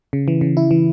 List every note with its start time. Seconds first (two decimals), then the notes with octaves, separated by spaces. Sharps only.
0.13 C#3
0.28 E3
0.41 C#3
0.57 E4
0.71 E3